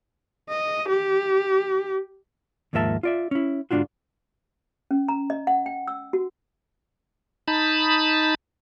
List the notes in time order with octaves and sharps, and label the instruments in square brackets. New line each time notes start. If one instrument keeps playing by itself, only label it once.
[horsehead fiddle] D#5
G4
[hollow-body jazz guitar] D#2 G#2 F3 A#3 E5 A5
F4 D5 E5
C#4 E4
G#2 D3 G3 D4 F4 F#4
[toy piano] C#4
A#5
D#5
F#5
G5
E6
F#4
[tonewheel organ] D#4 A5 B5